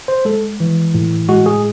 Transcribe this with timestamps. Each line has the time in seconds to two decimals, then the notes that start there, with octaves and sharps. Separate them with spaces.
0.08 C5
0.25 G#3 A4
0.60 E3
0.95 A2
1.29 G#3 F#4
1.46 G#4